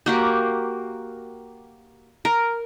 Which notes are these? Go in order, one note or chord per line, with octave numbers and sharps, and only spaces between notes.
A#3 F#4 G4
A#4